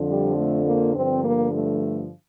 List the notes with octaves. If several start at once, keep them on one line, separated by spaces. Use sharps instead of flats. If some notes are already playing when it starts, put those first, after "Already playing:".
Already playing: F2 D3 F3
G3
A3
A#3
G2 D3 F3 C4
A#3
A3